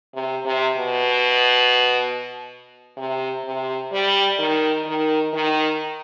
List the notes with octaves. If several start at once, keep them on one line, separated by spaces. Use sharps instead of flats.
C3
C3
B2
C3
C3
G3
D#3
D#3
D#3